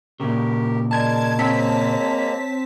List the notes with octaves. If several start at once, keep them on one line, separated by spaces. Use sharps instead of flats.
A#2 C#3 G4 A#4
G#3 A#4 D5 A5 G#6
G#3 A#3 C4 C#5 A5 A#5 B6